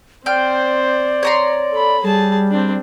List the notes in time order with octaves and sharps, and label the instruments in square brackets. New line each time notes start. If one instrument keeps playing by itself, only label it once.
[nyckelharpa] C4 C5 [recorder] D5 [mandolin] G5 F6
[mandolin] C#5 A#5 C6
[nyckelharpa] A4 B5
[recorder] G3 [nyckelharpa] G#4 A5
[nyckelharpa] C4 D4